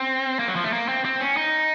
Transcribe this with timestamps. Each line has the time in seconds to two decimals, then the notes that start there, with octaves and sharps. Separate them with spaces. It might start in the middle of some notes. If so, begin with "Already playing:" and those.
Already playing: C4
0.39 A#3
0.48 F#3
0.56 F3
0.64 A3
0.73 A#3
0.88 C4
1.05 C4
1.21 C#4
1.37 D#4